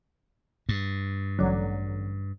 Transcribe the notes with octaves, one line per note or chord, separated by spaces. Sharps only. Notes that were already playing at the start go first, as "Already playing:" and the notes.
G2
A1 D3 F#3